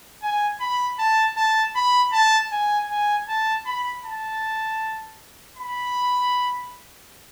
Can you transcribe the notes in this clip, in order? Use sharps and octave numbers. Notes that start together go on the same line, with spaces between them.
G#5
B5
A5
A5
B5
A5
G#5
G#5
A5
B5
A5
B5